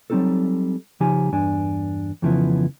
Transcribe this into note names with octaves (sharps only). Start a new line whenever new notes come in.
F#3 G3 C4 D#4 F4 A4
C#3 F3 D#4 G4 G#5
E2 G2 D4 G#5
F2 C#3 E3 F3 B3 E4